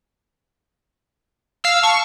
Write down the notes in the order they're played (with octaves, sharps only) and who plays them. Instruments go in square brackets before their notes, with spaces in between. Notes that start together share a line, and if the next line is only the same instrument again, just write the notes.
[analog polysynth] F5 E6
[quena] A5 [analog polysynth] C#6